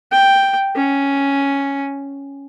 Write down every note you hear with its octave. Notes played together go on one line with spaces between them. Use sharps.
G5
C#4